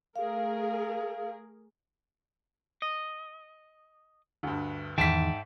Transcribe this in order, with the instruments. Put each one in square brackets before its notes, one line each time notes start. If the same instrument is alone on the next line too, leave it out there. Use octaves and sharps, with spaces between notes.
[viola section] A3 G#4 A#4 [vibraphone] F5
[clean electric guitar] D#5
[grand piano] D2 G2
[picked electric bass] E2 D#3 [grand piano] G#2 B6 [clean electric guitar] E5 G5 A5